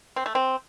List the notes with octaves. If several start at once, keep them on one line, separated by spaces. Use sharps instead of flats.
C4
A3
C4